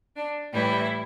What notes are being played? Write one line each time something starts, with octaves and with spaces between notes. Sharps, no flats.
D4
A2 E3 G3 E4